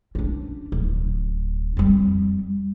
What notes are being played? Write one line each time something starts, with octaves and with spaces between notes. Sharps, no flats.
C#4 D4
D1
F2 G3